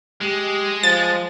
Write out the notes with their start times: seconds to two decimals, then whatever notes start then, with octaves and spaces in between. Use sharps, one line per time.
0.21 G#3 G4
0.83 F3 A6